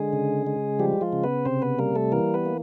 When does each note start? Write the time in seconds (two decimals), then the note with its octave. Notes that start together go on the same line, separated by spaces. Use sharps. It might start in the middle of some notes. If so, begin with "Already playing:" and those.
Already playing: D3 G#3 G#4
0.13 C#3
0.47 G#3
0.79 F3 G3 G4
1.01 F3 F4
1.13 C#3
1.24 B3 B4
1.45 C3 C4 C5
1.62 B3 B4
1.79 G3 A#3 A#4
1.95 A3 A4
2.12 E3 A#3 A#4
2.34 B3 B4
2.46 A#3